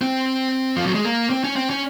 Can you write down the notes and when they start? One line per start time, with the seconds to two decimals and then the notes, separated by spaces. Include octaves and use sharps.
0.01 C4
0.76 F3
0.86 F#3
0.95 G#3
1.05 A#3
1.30 C4
1.44 C#4
1.56 C4
1.70 C#4